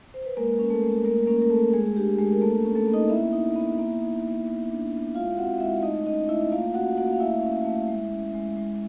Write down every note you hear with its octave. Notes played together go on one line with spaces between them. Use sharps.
C5
B4
G#3 A#3 A#4
C#4
A3 A4
G#3
A3 A#3 A#4
A#3 C#4 A#4
A#4
A3 A4
G#3 A3 G#4
D4 G4
G#3 A3 G#4
A#4
A3 A#3 A4
C#4
A3 A4
A#3
D#4 D#5
B3 E4 E5
D#4
B3
A#3
D#4
A#3
B3
D4
B3
G#3 F4 F5
C4 F#4 F#5
G#3 E4 E5
A3 D#4 D#5
C#4 D#4 D#5
A3 E4 E5
A#3 F4 F5
C#4 F#4 F#5
A#3 F#4 F#5
F5
A3 E4 E5
C#4
A3
G#3
C#4
G#3
G#3